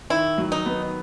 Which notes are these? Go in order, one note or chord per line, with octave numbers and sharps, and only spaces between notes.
D#3 E4
F#3
D#4
B3